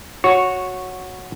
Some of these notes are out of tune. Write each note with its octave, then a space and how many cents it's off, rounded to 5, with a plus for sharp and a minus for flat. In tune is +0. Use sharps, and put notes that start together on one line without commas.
F#4 -10 C#5 +0